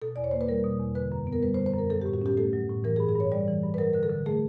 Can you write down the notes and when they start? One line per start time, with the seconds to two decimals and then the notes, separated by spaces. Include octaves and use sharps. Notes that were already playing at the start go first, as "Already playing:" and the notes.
0.02 B2 A4
0.16 E2 D5
0.24 C#5
0.31 A#3 C5
0.41 B4
0.49 G3 A#4
0.64 B2
0.79 E2
0.95 D3 B4
1.12 F#2
1.27 B3
1.33 A#4
1.43 G3 B4
1.54 C5
1.59 D3
1.66 C5
1.74 F#2 A#4
1.90 F#3 A4
2.02 A2 G4
2.13 F#4
2.22 C#4 G4
2.37 A3 A4
2.53 F#3
2.69 A2
2.84 E3 A#4
2.96 G#4
3.00 G2
3.09 G#4
3.15 G2 C#5
3.32 G3 D5
3.48 E3
3.63 G2
3.74 B4
3.78 F#3 A#4
3.93 D3 A#4
4.03 A4
4.10 D3
4.26 A3 G#4